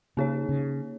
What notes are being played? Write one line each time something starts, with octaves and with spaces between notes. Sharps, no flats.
C#3 A#3 D#4 G#4 C#5
C#3